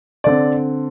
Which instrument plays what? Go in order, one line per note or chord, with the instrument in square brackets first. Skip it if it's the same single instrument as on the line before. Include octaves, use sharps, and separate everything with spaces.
[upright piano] D3 C4 D5